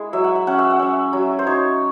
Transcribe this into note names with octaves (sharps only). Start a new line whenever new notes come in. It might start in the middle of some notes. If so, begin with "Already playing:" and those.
Already playing: G#3 E4 G#5
F#3 E5
F#5
E5
C#4 F#5
E5
F#5
C#4 E5
F#3
C5
D#4 C#5